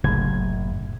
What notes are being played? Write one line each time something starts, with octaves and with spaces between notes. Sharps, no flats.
F#1 C2 A2 G#6